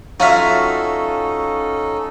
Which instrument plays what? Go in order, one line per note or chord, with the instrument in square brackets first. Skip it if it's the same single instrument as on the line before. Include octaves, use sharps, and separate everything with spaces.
[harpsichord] F#3 E5 [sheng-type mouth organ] C#4 D#4 A4 [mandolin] F4 F#4 F6